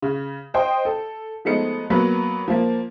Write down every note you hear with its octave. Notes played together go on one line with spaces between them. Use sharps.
C#3
C5 D#5 G5
A4
F3 G#3 A3 B3 D#4 C#7
F#3 A#3 B3 B4
F3 A#3